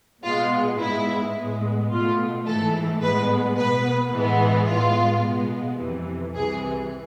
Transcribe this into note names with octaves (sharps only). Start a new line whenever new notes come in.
B2 G#3 B3 F4
G#2 G#3 B3 E4
A2 G#3 B3
B2 A3 F4
G#2 E3 A3 A4
A2 G#3 B3 B4
B2 B3 B4
A2 E3 G#3 B3
A2 G#3 B3 F4
B2 G#3 B3
F2 C3 E3
C2 C3 E3 G#4